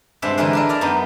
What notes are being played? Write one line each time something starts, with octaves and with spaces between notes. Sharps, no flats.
G2 C3 G#3 E5 F#5
D3 E3 G#3 E4 A#4 B4
D4 E4 A#4
A#4 D5 A#5
F#2 B3 D#4